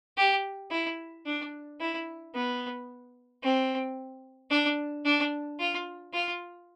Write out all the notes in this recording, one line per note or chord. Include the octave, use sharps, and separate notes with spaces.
G4
E4
D4
E4
B3
C4
D4
D4
F4
F4